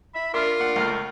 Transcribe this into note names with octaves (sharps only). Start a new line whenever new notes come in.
E5 B5
D4 F4 A#4 E5 C6
D4 F#5
C#2 A3 F6